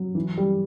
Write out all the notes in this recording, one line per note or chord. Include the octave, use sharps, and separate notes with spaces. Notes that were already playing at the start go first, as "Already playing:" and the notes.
Already playing: F#3
E3
G3